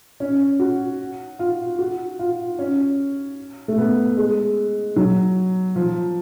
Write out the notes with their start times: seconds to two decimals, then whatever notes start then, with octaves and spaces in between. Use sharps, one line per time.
0.20 C#4
0.59 F#4
1.39 F4
1.78 F#4
2.19 F4
2.59 C#4
3.68 A3
3.78 B3
4.17 G#3
4.96 F#3
5.76 F3